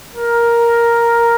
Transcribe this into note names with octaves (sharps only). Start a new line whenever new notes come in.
A#4